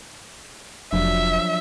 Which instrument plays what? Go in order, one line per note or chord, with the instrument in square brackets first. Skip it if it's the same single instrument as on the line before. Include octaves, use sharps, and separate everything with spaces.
[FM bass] F1 [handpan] F3 F#3 D4 [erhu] E5